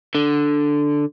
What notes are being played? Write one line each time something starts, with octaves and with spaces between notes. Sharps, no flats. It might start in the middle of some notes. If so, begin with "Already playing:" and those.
D3